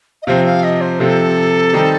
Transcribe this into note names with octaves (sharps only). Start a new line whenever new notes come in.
D#5
C3 F3 C4 F5
F5
D#5
C5
C3 F3 C4 A4
D#3 G3 C4 D#4 G4